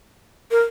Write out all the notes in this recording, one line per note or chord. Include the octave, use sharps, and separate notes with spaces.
A#4